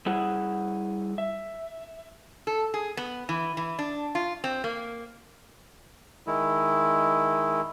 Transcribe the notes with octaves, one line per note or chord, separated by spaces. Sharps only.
G3 E4 G#4 F#5
E5
A4
G#4
B3
E3
E3
D4
F4
C4
A#3
D#3 G#3 E4